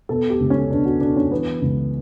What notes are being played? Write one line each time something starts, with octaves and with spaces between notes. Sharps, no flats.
B2 A4
G4
C#2
C#4
B2 D4
F#4
B2 D4
C#4
E3 B3
C#2